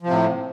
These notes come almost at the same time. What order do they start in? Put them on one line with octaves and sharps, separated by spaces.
F3 C3 A2